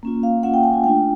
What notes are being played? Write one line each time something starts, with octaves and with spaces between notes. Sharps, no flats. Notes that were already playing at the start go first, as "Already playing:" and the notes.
A#3 C#4 F4
F5
A#3 C#4 F4 F#5
G5
G#5
G#5
A3 D4 F4 G5